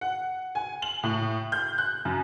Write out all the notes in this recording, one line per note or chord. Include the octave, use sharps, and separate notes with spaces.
F#5
G#5
F#7
A2
G6
F#6
F#2